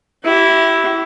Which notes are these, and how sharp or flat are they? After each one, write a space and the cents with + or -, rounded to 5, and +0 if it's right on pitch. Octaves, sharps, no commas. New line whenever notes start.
E4 +0 G4 -40